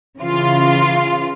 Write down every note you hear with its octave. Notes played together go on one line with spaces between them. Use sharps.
C#3 E3 F4